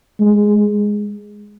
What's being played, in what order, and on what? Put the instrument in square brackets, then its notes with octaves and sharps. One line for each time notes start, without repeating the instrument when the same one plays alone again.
[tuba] G#3